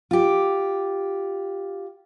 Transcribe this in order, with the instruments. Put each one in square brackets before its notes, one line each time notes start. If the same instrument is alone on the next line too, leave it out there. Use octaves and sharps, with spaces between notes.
[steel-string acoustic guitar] F4 G4